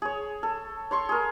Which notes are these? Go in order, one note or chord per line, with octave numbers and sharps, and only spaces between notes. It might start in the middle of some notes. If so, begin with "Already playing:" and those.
G#4 C#5
A4
C#5 C6 C#6
G#4 A#4